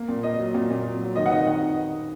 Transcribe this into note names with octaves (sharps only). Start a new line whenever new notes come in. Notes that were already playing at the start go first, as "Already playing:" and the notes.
Already playing: A#3
A#2
A#3 D#5
F#3
A#2
A#2
F#3
F#3
D#3 D#5
F#5
D#3 D#5
D#3 F#5